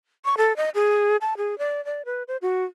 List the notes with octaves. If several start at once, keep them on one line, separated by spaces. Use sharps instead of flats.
C#6
A4
D#5
G#4
A5
G#4
D5
D5
B4
C5
F#4